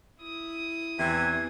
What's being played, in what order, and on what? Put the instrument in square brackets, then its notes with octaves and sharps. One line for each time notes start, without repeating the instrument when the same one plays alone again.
[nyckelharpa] E4 D#6
[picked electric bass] E2 [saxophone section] C3 E3 [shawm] G#5